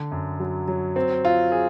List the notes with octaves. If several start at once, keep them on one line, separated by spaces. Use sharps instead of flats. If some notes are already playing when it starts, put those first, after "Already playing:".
Already playing: D3
F#2
F#3
F#3
C4
F4
G#4